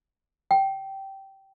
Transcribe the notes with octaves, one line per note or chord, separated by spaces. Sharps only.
G5